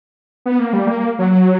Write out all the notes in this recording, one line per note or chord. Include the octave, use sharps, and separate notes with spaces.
B3
A#3
G3
A#3
F#3